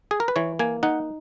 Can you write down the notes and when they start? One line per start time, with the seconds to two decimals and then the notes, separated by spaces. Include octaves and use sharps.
0.11 G#4
0.20 A#4
0.28 B4
0.36 E3 C#5
0.59 A#3 G#5
0.83 D#4 F#5